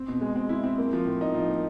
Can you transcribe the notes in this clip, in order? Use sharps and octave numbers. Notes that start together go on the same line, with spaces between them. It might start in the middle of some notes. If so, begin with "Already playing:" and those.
Already playing: C4
B2
G#3
C4
E4
C4
A#3
F3
A2
D#4
F3
A#3